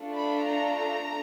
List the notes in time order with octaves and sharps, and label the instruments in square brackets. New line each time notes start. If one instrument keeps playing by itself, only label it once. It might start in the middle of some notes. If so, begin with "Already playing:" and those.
Already playing: [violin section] A3 D4 F4 A4
B5
A#5